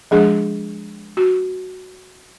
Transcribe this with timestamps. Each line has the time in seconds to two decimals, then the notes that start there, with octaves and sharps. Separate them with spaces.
0.11 F3 G#3 D4 G#4
1.17 F#4